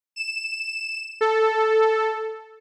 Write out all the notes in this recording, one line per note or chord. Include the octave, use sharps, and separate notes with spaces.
E7
A4